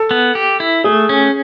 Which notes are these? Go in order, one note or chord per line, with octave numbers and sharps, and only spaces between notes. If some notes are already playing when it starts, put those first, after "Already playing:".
Already playing: A4
B3
G4
E4
A3 G#4
C#4